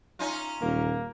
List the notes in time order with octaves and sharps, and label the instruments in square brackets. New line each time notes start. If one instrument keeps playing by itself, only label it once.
[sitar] C#4 D#4 F4
[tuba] D#1 [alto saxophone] A#3